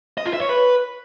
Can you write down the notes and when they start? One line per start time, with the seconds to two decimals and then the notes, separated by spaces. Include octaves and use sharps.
0.18 D#5
0.25 F4
0.33 E5
0.41 C#5
0.49 B4